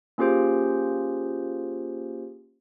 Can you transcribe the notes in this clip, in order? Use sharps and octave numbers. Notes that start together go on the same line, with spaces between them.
A#3 C#4 F4 G4 G#4 C5